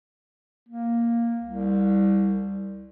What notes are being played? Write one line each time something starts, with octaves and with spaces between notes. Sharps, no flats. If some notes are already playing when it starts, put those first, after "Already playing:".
A#3
C2